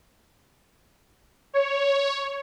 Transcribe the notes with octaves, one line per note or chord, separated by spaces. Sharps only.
C#5